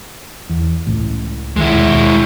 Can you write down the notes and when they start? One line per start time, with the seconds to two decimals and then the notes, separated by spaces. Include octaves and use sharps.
0.49 E2
0.87 C#2 A2
1.56 C#2 D#3 G#3 E4
1.73 D#2 B2